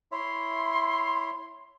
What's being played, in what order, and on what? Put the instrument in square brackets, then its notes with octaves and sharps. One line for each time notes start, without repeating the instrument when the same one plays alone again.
[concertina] E4 C#5 E5 [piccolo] C6